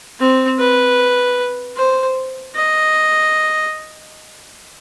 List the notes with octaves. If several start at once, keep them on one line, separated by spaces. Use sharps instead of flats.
C4
B4
C5
D#5